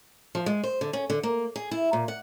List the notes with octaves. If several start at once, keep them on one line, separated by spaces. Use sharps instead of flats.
F3
G#3
C5
D3
C#4
D3
A#3
G#4
E4
A#2
F#5